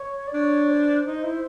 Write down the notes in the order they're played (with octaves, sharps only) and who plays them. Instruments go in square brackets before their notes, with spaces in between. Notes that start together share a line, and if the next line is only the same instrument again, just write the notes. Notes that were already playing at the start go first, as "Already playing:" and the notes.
Already playing: [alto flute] C#5
D5
[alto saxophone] D4 [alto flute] C#5
[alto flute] C5
[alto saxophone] D#4
E4